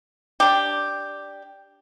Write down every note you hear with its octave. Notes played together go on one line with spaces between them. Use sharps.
D4 G4